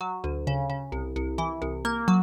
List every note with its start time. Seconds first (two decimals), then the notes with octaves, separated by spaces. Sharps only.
0.01 F#3
0.24 D2
0.47 C#3
0.70 C#3
0.92 C2
1.16 C2
1.38 E3
1.62 C2
1.85 A#3
2.08 F#3